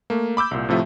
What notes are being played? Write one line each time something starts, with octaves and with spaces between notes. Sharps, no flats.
A3 A#3
B5 D6 E6 G6
C2 A#2
A2 C3 F3 A3 E5